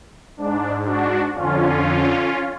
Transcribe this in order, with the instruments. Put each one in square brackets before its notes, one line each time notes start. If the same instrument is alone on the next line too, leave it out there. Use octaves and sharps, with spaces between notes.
[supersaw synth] G#2 D4
D4 F#4
F2 D3 C#4 F4